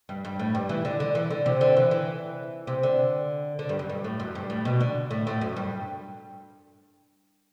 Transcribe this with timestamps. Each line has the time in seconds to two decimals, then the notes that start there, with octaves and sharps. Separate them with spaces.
0.09 G2
0.25 G2
0.39 A2
0.55 G2
0.69 E3
0.85 D3
1.00 D3
1.15 E3
1.30 D3
1.46 C3
1.61 D3
1.77 E3
1.91 E3
2.67 C3
2.83 D3
3.59 D3
3.69 G2
3.79 F#2
3.90 G2
4.04 A2
4.20 F#2
4.35 G2
4.50 A2
4.65 B2
4.81 D3
5.11 A2
5.27 A2
5.41 F#2
5.56 G2